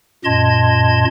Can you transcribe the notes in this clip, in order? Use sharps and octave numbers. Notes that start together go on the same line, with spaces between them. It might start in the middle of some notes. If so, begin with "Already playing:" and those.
F#2 A#2 D#5 A5 C6 G#6